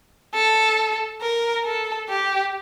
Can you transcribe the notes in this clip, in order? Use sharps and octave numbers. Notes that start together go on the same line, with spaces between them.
A4
A#4
A4
G4